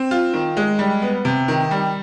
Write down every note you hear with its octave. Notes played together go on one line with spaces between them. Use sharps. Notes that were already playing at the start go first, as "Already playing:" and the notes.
Already playing: C4
F4
D#3
G#3
G3
B3
C3
D#3
G3